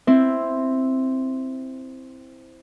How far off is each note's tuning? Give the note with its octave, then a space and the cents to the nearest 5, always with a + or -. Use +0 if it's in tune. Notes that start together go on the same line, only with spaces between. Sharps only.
C4 +0 E4 +0 C5 +0